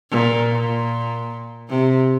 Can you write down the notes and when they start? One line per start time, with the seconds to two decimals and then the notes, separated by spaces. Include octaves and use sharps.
0.11 A#2
0.51 A#2
1.69 C3